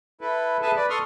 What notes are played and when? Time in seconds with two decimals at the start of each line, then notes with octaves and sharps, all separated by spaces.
0.21 E4 A4 B4
0.62 G#4 A4 B4 E5 G#5 A5
0.76 B4 D5
0.90 A4 C6 C#6 D#6 F6